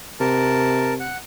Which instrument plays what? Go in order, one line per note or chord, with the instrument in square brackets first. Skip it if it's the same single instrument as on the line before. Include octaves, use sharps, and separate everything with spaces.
[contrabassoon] C3 [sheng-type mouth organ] A#4 A5
[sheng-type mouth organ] F#5